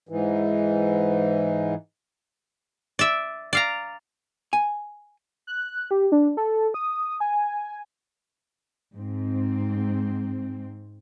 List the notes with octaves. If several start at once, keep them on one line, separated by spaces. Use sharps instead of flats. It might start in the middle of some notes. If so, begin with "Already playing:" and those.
G#2 E3
D5 E5
D5 F5 A#5
G#5
F#6
G4
D4
A4
D#6
G#5
G#2 C4